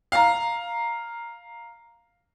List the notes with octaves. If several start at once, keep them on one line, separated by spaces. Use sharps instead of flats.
F5 A#5